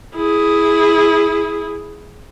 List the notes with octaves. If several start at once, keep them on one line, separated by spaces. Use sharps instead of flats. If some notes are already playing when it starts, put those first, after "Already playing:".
E4 G#4